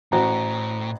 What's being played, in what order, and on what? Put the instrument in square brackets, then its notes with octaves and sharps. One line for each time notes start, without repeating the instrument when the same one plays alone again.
[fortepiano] A1 F#4 [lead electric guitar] A2 [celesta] C5 A#5